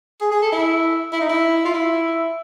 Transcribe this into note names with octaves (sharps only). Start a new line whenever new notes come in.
G#4
G#4
A4
E4
E4
D#4
E4
F4
E4